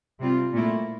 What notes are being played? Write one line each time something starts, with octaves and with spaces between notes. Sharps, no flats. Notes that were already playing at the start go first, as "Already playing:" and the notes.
C3 G3 C4 F4
A#2 A3 E4